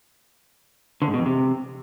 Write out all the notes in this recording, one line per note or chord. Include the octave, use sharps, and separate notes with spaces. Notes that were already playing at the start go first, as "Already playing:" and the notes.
D3
G#2
B2
F2
C3